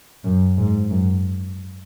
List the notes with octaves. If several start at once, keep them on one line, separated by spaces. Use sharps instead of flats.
F#2
G#2
F#2